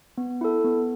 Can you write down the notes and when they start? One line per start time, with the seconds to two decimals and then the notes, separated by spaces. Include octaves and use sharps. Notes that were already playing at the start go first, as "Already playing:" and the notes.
0.18 B3
0.41 E4 A4
0.64 B3